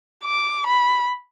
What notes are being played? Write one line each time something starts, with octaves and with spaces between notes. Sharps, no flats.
D6
B5